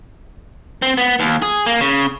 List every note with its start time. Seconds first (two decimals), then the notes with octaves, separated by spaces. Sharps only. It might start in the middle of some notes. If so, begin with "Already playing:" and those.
0.82 C4
0.98 B3
1.20 D#2
1.42 G#4
1.66 A#3
1.80 C#3